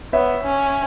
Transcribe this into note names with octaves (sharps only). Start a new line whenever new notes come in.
B3 C#5 E5
C#4